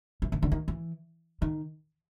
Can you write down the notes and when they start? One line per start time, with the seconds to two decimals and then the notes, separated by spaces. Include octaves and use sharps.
0.22 E3
0.32 D#3
0.43 D3
0.52 D#3
0.68 E3
1.42 D#3